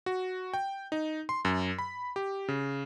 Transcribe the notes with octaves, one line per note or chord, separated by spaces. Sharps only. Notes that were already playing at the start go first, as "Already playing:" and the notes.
F#4
G5
D#4
C6
F#2
B5
G4
C#3